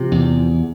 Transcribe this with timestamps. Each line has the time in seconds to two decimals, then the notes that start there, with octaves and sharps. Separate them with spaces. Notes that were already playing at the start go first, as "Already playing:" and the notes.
Already playing: C3 F3
0.12 E2